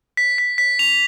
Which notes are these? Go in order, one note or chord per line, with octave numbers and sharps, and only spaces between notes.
B6
B6
B6
F7